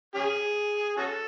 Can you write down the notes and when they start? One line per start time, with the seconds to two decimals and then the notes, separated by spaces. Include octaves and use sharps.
0.15 C#4 G#4
0.97 C#4 F#4 A4